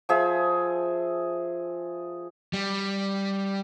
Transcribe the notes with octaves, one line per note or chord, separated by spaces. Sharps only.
F3 G#4 E5
G3